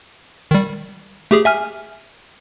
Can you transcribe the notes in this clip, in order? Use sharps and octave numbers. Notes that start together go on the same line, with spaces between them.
D#3 G3
A3 G4 G#4
E5 G#5 F6